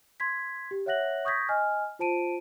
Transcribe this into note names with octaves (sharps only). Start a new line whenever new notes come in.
C6 G#6 B6
G4
C#5 E5 F#5 F#6 A#6 F#7
C#6 D#6 G6 G#6 A#6 B6
D#5 G#5 F6
F4 C5 A5 D7 D#7